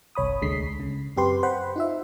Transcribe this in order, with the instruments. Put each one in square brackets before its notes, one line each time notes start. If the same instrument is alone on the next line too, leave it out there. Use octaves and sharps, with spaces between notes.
[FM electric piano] G1 C2 C#5 B5 D#6
D2 D3 G#3 B6 C7
C#3
F#2 C4 G4 B4 C6
C5 F#5 B5
D#4 F4 E5